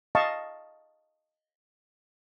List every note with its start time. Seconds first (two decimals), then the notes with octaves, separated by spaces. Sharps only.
0.15 D#5 F5 A5 C#6